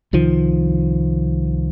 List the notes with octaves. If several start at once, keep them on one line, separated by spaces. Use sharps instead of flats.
C2 D#3 F3